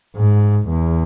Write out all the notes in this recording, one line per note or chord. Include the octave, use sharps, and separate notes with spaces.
G#2
E2